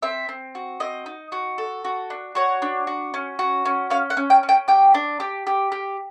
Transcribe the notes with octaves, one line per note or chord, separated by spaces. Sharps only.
C4 E5
C4
F#4
C4 D#5
D#4
F#4
A4
F#4
D4
F#4 C#5
D4
F#4
C#4
F#4
C#4
C#4 F5
F#5
C#4
G5
C#4
G5
G4 G5
D4
G4
G4
G4